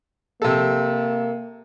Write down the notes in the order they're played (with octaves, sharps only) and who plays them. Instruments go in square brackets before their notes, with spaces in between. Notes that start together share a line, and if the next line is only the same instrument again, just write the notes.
[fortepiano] C3 A4 [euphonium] A#3